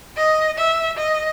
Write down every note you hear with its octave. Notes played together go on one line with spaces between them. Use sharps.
D#5
E5
D#5